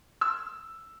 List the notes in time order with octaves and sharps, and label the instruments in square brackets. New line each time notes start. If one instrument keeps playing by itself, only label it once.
[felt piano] E6